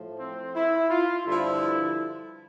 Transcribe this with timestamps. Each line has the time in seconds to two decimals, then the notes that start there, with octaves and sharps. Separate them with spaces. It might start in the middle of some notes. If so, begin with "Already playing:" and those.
Already playing: A2 F3
0.19 C4
0.55 E4
0.90 F4
1.25 G2 D3 F3 E4